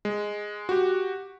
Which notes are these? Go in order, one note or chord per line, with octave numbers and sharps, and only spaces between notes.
G#3
F#4 G4